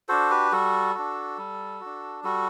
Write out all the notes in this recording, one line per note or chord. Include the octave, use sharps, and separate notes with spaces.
D4 F#4 A4 C5
G4 B4
G3 F#4 A4
D4 F#4
G3
D4 F#4
G3 F#4 A4